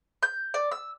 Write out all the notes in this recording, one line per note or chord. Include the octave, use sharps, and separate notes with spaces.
G6
D5
E6